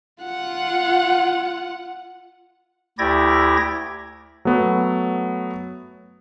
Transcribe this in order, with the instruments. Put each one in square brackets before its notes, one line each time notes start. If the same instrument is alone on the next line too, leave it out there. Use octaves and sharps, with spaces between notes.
[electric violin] F4 F#5
[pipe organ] D2 E4 G4 D5 G#6 A#6
[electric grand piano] F#3 A3 B3